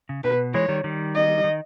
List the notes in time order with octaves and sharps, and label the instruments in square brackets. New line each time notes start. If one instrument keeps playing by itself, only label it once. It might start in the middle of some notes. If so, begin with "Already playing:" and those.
[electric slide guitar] C#3
[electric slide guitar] B2 [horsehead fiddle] B4
[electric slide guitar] E3 G#3 [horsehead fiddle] C#5
[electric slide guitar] D#3 G3
D#3 G3
[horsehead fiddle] D#5
[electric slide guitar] D#3